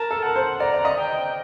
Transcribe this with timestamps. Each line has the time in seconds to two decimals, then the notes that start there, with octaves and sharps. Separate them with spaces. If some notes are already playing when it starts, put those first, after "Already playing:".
Already playing: A#4 A5
0.11 A4
0.23 A#4 F#5
0.36 C5
0.60 D5 A#5
0.74 D5
0.85 D#5
0.98 G5